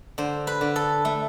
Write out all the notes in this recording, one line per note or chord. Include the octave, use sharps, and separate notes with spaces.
D3 C5
B4
D3
A4
A3